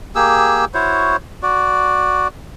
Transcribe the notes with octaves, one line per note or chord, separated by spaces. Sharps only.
A#3 G4 G#4 E6
E4 F#4 C5 C#5
F#4 D5